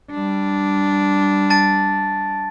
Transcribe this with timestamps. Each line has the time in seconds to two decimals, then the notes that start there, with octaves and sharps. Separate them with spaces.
0.11 G3 D4
1.50 A5 A6 D7